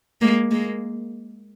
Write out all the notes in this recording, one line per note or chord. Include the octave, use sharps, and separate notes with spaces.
G#3 A#3
G#3 A#3